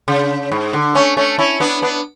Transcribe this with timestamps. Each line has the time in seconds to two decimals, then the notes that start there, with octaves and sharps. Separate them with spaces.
0.08 C#3
0.51 G#2
0.73 D3
0.95 A3 C#4
1.17 A3 C#4
1.38 C#4 E4
1.60 B3 D4
1.82 B3 D4